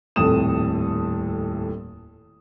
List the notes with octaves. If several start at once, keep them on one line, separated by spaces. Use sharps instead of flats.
D#1 F2 A2 A4 D#6 E7